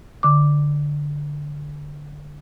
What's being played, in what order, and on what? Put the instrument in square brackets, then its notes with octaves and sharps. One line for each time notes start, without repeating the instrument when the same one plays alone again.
[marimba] D3 D6